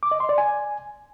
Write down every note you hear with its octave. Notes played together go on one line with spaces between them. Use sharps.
D6
D#5
C6
D5
G#5